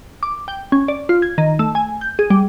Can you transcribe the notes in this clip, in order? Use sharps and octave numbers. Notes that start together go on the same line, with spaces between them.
D6
G5
C#4
D5
F4
G#6
D#3
A3
G#5
G6
G#4
G3